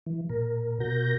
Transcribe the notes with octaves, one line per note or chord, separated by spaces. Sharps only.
E3
A#2 A#4
B2 F#4 A#4 G6 A#6